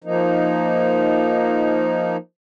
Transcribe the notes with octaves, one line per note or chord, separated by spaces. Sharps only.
F3 A#3 D#4